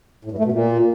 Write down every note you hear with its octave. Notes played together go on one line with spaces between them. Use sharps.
A2
G2
A3
B2
A#2